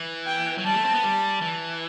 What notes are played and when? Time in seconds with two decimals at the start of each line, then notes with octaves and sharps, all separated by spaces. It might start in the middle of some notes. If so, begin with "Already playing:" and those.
Already playing: E3
0.26 G5
0.58 F#3
0.65 G3 A5
0.75 A3
0.85 C4
0.95 B3
1.03 G3
1.41 E3